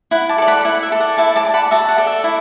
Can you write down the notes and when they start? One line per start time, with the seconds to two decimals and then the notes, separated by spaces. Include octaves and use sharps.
0.11 E4 F#5
0.29 A5 D6
0.38 A4 D5
0.47 F#5 B5
0.65 E4 F#5
0.83 E5
0.92 A4 D5
1.00 F#5
1.18 E4 E5 A5
1.36 A5 D6
1.45 D5
1.54 F#5 B5
1.71 F#4 E5 A5
1.89 F#5
1.98 A4 D5
2.07 E5
2.24 E4